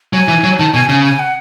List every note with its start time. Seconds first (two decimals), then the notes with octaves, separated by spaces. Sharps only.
0.13 F#3 G#5
0.28 E3
0.44 F#3
0.59 D#3 A5
0.74 B2 G#5
0.89 C#3 G#5
1.04 G#5
1.19 F#5